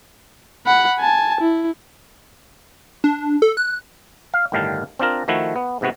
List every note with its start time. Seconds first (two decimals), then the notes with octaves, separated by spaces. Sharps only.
0.66 F#5 B5
1.00 G#5 A5
1.41 E4
3.04 D4
3.42 A4
3.57 F#6
4.34 F5
4.52 G1 A2 D#3 G3 F5 A5
4.99 C4 D4 F4 A#4
5.28 D#3 F3 A3 E4 F#4
5.56 B3
5.81 G#2 C3 B3 F#4